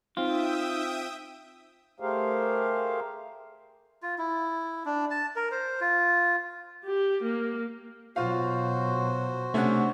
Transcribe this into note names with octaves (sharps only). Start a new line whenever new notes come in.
C4 D#4 F4 E5 G5 D#6
A3 G4 G#4 A#4 C5 F5
F4
E4
D4
A5
A#4
C5
F4
G4
A#3
B2 F#3 F4 F#4 C5 F5
C3 A3 C#4 D4 F#5